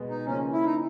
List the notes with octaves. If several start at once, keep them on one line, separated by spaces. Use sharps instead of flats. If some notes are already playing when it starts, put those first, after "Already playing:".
Already playing: B2 G#3 B3
D#4
C#3 F3 A#3 C#4
E4
D#4